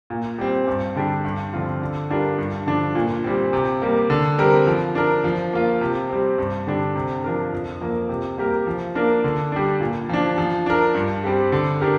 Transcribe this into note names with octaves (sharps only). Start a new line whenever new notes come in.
A#2
G3 C4
G2
D3 G3 D4 G4
G2
D3 F3 C4 F4
D3
G3 D4 F4 A#4
G2
D3 F3 D4
A#2
G3 C4
C3
G3 A#3
D3
G3 C4 A#4
F3
D4 A#4
F3
A#3 F4
C3
G3 C4
G2
D3 G3 D4
C3
F3 D4 A#4
F2
F3 A#3
C3
G3 A#3 G4 A#4
F3
A#3 D4 A#4
D3
G3 D4
A#2
F3 D4
F3
D4 A#4
G2
G3 C4 G4
D3
D4 G4 A#4